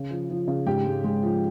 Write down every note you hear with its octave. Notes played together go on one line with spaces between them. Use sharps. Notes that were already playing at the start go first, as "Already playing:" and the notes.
Already playing: C#3
F3
F3
C#3
G#2 G4 G5
G#3
G#3
F3